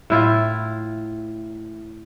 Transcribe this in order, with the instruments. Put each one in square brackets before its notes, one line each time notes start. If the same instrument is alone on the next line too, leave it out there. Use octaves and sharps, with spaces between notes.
[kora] A2 E4 F4